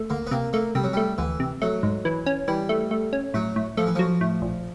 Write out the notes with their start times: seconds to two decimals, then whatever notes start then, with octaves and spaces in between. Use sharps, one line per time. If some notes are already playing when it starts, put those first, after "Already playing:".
Already playing: A3
0.10 D2 A#3
0.27 B3
0.31 C3 A#3
0.53 A3 A#3
0.75 C3 G3
0.84 F#3
0.93 G3 A3
1.18 D2 E3
1.40 C3
1.62 F#3 A3
1.83 G#2
2.05 E3
2.26 C#4
2.48 E3 G3
2.69 A3
2.91 A3
3.13 C#4
3.34 A2 F#3
3.56 A2
3.77 F3 A3
3.87 E3
3.95 F3 F#3
4.21 A2
4.42 A#1